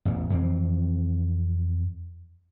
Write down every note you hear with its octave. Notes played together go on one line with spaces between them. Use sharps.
A1 E2
F2 E3 C4